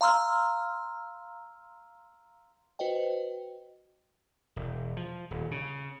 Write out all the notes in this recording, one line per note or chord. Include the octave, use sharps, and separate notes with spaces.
F5 A#5 C6 E6 F6
F#4 B4 C5 D#5 G5
E1
F3
D#1
C#3